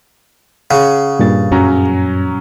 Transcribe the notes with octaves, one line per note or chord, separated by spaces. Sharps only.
C#3 F#5
G2 A#2 A6
F#2 F#3 C#4 A#5